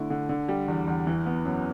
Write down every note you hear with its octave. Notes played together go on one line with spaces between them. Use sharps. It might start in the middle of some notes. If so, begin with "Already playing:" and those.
Already playing: D3 A3 E4
D3
D3
G3
E2
E2
E3
B3
F#2